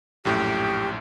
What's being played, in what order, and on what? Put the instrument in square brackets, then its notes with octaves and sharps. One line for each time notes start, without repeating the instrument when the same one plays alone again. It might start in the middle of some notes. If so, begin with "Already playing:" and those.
[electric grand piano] A#1 F#2 A2 [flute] G4